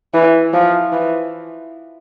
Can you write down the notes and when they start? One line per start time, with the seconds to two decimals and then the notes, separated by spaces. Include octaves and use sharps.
0.14 E3
0.54 F3
0.92 E3